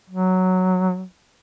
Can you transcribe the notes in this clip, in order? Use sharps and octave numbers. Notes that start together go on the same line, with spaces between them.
F#3